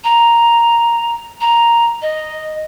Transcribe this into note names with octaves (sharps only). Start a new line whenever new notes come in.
A#5
A#5
D#5